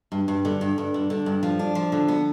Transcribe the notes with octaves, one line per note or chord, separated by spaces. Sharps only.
G2
G2
D3
G2
G2
D3
D3
G2
F3
D4
F3
D3
B3